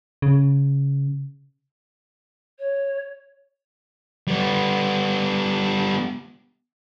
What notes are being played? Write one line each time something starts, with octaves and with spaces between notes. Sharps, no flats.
C#3
C#5
G3 B3